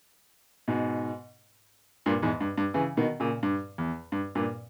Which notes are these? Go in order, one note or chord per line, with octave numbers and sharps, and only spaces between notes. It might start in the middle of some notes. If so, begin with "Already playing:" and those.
G#2 B2
G2 A#2
E2 G#2
G2
G2
C#3 E3
B2 D#3
A#2 C#3
G2
E2
G2
G2 A#2